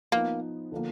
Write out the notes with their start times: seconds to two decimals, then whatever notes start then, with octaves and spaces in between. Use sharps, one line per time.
0.12 F3 A#3 B3 D#4
0.72 D3 F3 A#3